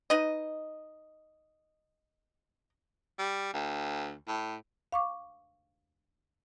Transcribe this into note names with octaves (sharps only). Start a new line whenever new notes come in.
D#4 B4 D#5
G3
D2
A2
F5 C#6 D6